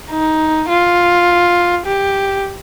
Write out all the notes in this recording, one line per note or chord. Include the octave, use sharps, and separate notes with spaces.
D#4
F4
G4